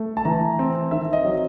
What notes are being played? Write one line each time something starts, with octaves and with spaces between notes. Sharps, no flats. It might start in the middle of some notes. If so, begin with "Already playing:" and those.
Already playing: A3
A5
E3 A#5
C4
D#3 E5
D#5
F#3